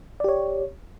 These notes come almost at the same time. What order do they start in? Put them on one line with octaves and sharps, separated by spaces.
D5 G4 C#5